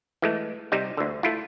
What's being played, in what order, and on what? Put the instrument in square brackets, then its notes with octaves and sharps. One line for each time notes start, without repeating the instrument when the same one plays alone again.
[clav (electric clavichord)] E3 G#3 A3
C3 G3 D#4
D2 D3
A3 E4 F4